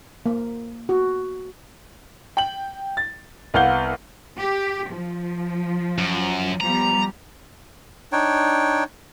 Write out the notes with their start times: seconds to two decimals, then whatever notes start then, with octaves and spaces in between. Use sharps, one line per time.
0.26 A#3
0.89 F#4
2.37 G5 F#7
2.97 A6
3.54 C2 B3 F5 F#5 G6 G7
4.40 G4
4.90 F3
5.98 F#2
6.61 F3 G3 B3 A#5
8.12 D4 D#4 C#5 G5